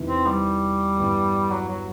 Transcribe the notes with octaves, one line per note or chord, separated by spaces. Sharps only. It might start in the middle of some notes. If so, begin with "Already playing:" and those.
Already playing: E2 C3 E3 B3 D#4
C4
G3
G2 E3 B3
F#3
F#3